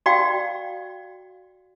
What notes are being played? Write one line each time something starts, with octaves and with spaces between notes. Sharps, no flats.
F#4 D5 F5 G5